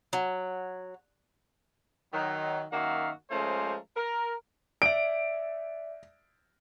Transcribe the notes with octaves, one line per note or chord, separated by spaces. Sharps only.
F#3
D#3 F#3
F#2 D#3 A#3 F#4 E5 F5
F3 G#3 A3 C#4 A#4 C5
A#4
D5 E5 D7